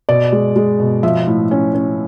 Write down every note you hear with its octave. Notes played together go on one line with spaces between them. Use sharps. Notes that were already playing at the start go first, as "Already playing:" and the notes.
B2 D5
G#3
G#3
B2
F3 E5
A2
C#4
C#4